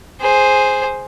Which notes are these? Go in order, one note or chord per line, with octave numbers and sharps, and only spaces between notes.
G#4 C5